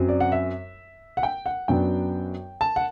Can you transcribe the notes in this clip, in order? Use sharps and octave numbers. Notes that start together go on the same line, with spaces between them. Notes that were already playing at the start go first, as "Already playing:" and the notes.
Already playing: F#2 F#3 C4
D5
F#5
E5
F#5
G5
F#5
F#2 F#3 B3 D4 G5
A5
F#5